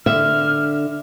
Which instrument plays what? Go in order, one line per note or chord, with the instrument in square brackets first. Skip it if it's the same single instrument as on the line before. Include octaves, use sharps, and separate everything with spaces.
[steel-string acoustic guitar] D3 [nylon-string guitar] E5 [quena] F6